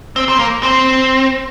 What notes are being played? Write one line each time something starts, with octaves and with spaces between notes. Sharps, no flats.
C4
C4
A#3
C4